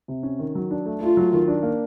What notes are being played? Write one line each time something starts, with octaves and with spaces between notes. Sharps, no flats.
C3
C#4
D#3
F#3
D4
A3
A3 F4
F#3
D#3
D4
A#3